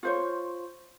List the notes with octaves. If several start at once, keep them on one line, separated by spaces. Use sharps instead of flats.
F4 C5 C#5